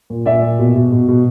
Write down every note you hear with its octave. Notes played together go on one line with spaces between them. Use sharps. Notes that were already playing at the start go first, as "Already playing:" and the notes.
A#2
A#2 D5 E5
A#2
B2
B2
B2
B2